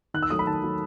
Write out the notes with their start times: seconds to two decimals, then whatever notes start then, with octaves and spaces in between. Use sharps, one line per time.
0.14 D#3 F#6
0.23 E6
0.30 F#3 A3 D#6
0.39 B5
0.47 D#3 A5
0.63 F#3 A3